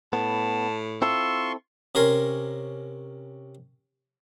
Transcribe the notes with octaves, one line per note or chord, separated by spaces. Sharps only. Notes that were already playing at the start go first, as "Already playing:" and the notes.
A2 B3 A5
C4 E4 F4 A4 C6 C#6 E6
C3 C#4 A#4 G#5 C6